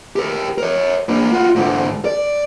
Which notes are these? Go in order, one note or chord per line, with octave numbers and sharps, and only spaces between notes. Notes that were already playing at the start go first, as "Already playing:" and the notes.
G4 A#4
A#4 C#5
A#3 D4
F4 F#4
G#2 D3
D5